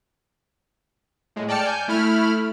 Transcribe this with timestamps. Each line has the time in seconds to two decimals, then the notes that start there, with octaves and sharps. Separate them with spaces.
1.36 A2 G#3
1.48 D5 G5 A5 F6 C#7
1.65 G#5 G6
1.88 A3 E4 B5 F6